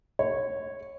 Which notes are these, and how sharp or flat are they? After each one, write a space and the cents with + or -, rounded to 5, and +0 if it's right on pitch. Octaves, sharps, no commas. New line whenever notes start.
C#5 -15